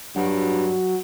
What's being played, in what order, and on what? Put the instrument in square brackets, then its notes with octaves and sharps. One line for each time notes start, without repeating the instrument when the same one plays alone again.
[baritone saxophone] G2 [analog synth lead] F#3